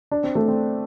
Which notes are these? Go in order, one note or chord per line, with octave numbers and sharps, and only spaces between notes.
D4
C4
A3
C4